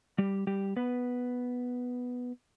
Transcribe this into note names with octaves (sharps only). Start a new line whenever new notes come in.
G3 G4
G3 G4
B3 B4